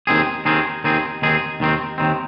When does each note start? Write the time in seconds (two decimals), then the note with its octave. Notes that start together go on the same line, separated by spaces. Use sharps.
0.07 D#2 D#3 C4 G#4
0.45 D#2 D#3 C4 G#4
0.84 D#2 D#3 C4 G#4
1.22 D#2 D#3 C4 G#4
1.60 D#2 D#3 C4
1.98 D#2 D#3 C4